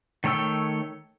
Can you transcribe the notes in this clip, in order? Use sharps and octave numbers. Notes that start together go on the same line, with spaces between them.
D#3 A3 C#5 G5 E6